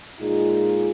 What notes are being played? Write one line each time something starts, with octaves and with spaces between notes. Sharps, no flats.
A#2 G#3 D#4 F4 G#4